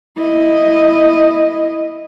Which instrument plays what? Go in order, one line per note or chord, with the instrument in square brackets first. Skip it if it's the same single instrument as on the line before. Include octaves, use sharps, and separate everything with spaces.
[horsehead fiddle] E4 D#5